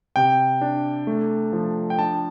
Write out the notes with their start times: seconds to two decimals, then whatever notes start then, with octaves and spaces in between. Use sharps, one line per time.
0.16 C3 G5
0.61 D4
1.07 A3
1.53 F3
1.90 G5
1.98 D4 A5